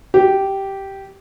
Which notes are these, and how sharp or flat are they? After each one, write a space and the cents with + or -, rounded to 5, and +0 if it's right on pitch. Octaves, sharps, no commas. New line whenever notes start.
G4 -10